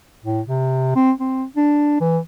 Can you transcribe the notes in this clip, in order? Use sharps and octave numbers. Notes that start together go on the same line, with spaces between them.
A2
C3
C4
C4
D4
E3